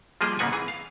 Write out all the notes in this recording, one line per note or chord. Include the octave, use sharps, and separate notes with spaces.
F3 G3 A#3 G4 G#4 D#5
G#2 C#3 A#3 B3 F#5 G#5
E3 G#4
F5